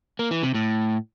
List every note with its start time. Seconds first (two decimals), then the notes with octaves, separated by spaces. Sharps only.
0.19 A#3
0.31 E3
0.43 C3
0.54 A2